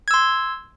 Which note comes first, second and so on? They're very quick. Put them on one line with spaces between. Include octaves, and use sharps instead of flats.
G#6 E6 C6